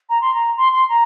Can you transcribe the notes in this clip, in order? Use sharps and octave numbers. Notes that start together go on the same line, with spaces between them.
A#5
C6
A#5
C6
C6
A#5